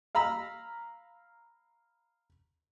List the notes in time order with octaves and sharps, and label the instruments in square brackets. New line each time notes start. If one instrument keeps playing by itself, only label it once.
[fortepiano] F5 A#5 B5 E6